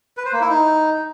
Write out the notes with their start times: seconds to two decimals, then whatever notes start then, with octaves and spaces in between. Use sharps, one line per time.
0.17 B4
0.25 C5
0.33 A#3
0.41 E4
0.49 D#4